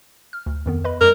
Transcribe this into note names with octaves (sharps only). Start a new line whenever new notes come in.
F6
D2
F2 D#3 B3
B4 D#5 B5
F#2 G3 A#4